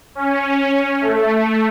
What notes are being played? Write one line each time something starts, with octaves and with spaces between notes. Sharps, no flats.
C#4
A3